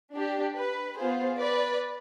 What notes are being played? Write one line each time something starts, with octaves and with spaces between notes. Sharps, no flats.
D4 G4
B4
B3 F4 G#4 C5
B4 D5